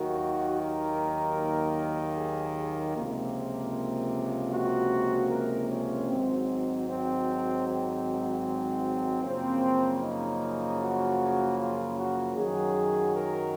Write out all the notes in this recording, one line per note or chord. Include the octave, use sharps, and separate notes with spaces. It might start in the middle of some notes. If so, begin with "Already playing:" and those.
Already playing: D#2 D#3 F#3 A#3 F#4
A#4
G#4
C#2 C3 F3 A#3
F#4
A#4
C#4
G#1 G#2 F#3 C4
C4
C4
F#2 C#3 F3 A#3 C4
D#4
F#4
F4
F#4
F#2 D#3 F#3 G#4
A#4